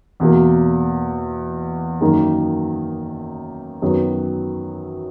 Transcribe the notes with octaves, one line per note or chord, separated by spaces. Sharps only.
E2 B2 A#3
F#2 D#3 A#3 D#4 A#4
F#2 D#3 F#3 B3